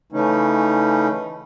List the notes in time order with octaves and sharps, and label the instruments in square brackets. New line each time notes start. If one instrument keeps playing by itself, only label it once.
[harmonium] C#3 E3 A3 C#4 D#4